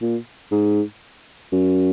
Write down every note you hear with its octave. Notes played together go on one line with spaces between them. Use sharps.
A#2
G#2
F#2